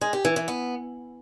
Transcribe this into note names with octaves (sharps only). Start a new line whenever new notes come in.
G#3
G4
E3
E3
B3